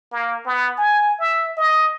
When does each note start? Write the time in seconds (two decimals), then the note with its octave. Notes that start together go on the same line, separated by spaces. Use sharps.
0.12 A#3
0.46 B3
0.78 G#5
1.19 E5
1.57 D#5